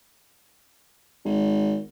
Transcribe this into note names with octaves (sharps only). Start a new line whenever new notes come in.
G#1